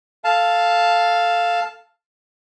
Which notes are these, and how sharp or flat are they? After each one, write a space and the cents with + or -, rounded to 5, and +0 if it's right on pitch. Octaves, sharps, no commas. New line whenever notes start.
A4 +0 F5 +0 A5 +0